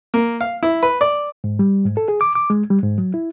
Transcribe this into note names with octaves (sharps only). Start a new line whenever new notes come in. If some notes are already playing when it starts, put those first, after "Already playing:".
A#3
F5
E4
B4
D5
G#2
G3
G#2
A4
G#4
D6
D6
G#3
G3
G#2
F#3
E4